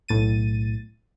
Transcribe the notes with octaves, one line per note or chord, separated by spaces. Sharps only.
B1 A2 A6 D#7